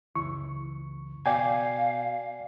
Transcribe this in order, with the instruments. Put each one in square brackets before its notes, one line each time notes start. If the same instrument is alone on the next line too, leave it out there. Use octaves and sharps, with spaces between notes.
[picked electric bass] F#1 C#2 E3 [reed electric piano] C#6
[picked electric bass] B2 [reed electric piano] D5 G5 G#5 [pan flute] F5